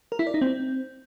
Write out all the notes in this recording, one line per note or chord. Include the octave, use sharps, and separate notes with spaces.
A#4
E4
D5
D#4
C4